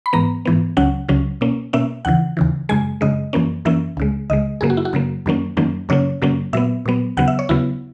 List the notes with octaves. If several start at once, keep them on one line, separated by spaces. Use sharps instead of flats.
B5
G#2 E3 B3 A#5
G#2 E3 B3
C#2 C#3 F#3 C#4 F#5
C#2 C#3 F#3 C#4
B2 A#3 C#4
B2 A#3 C#4 E5
D#2 C#3 E3 F#5
D#2 C#3 E3
F#2 C#3 G#3 G#5
F#2 C#3 G#3 D#5
F#2 E3 A#3 C#4
F#2 E3 A#3 C#4 E5
C#2 C#3 G#3
C#2 C#3 G#3 D#5
F#2 C#3 F#3 A#3 G#4
F#4
E4
F#4
F#2 C#3 F#3 A#3
F#2 D#3 F#3 A#3 C#4
F#2 D#3 F#3 A#3 C#4
F#2 C#3 F#3 A#3 C#4 C#5
F#2 C#3 F#3 A#3 C#4
A#2 F#3 B3 E5
A#2 F#3 B3
D#2 C#3 F#3 B3 F#5
E5
C#5
D#2 C#3 F#3 B3 E4